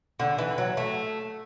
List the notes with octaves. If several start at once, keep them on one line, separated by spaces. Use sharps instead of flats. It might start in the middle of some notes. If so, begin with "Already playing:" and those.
D3
E3
F#3
A3